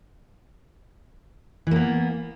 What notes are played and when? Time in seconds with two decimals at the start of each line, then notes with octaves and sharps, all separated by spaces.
1.67 E3
1.71 A#3
1.76 B3